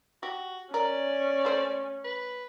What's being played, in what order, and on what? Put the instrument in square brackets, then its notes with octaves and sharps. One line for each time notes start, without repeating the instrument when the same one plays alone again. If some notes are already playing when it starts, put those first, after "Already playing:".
[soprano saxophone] F#4 [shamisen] G4
[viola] C#4 [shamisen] A#4 [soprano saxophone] D5
[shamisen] A3 C5
[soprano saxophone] B4